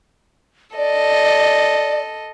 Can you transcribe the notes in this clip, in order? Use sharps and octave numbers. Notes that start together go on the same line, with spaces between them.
A4 D5 D#5